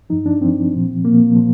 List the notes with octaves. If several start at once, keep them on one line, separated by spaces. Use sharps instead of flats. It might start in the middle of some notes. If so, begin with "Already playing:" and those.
G2 F3 D#4
D4
G2 F3 C4
A#2 F3
A#2 F3 A#3
A#2 F3